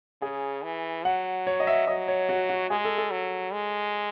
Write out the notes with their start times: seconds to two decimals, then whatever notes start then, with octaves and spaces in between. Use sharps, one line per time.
0.22 C#3 G#4
0.64 E3
1.05 F#3 F#5
1.47 C#5
1.60 D#5
1.67 E5
1.87 F#3 D#5
2.08 C#5
2.29 F#4
2.49 F#4
2.70 G#3 G#4
2.85 A4
2.98 A4
3.11 F#3
3.53 G#3